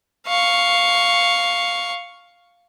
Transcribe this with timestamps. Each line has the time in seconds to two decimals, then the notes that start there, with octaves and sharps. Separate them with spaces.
0.27 F5 C#6